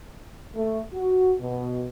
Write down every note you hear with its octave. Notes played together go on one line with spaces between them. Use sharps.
A3
F#4
B2